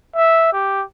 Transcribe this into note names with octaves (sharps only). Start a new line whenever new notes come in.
E5
G4